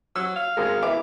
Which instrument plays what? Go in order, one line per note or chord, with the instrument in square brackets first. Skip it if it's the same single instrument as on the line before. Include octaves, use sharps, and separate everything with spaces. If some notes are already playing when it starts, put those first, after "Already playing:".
[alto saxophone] F#3 [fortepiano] E6
[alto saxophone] F5
[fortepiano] G#1 G#3 [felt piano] A#4
[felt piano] E4 B4 E5 [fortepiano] D6